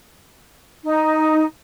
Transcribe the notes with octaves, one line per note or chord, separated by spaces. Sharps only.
D#4